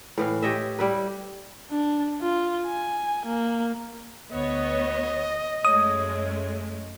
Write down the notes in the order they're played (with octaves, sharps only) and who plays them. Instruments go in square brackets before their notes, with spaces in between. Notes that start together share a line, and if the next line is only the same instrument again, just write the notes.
[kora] A2 E3 F5
G4 C#5 D#5 E5
G3 E4 B4
[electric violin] D4
F4
G#5
A#3
[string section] D2 B3 C#5 [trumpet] D#5
[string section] F#2 G#3 A3 [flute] C#5 [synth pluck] D#6